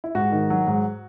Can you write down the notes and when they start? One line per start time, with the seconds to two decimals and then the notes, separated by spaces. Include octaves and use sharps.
0.04 E4
0.15 G#2 F#4
0.32 D#3
0.50 F#3
0.67 G#2